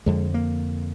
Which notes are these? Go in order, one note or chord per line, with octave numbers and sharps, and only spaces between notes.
F2 D3 G#3
A#3